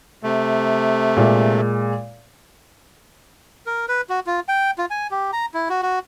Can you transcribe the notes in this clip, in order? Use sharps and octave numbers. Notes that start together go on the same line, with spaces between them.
C3 A3
A#2 G#3
A#4
B4
F#4
F4
G5
F4
G#5
G4
A#5
E4
F#4
F#4